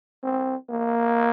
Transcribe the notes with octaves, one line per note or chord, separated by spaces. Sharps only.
C4
A#3